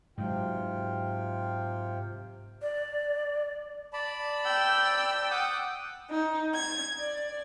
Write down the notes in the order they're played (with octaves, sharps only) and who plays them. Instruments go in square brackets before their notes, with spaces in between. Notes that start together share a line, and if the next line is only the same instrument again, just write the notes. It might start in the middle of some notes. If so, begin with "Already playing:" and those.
[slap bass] G#2 F#3 [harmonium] C3 F4 G5
[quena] D5
[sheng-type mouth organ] D5 A5 B5
[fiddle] G5 E6
[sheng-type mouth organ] F#5 D6 D#6
[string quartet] D#4
G#6
D5